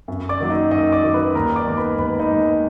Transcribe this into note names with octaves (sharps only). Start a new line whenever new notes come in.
F#2
D5 D6
D#3 F#3 A#3
D#4 D#5
F#2 D#4 D#5
D5 D6
D#3 F#3 A#3
B4 B5
D#2 A#4 A#5
D5 D6
D#3 G#3 B3
B4 B5
D#2 B4 B5
D#4 D#5
D#3 G#3 B3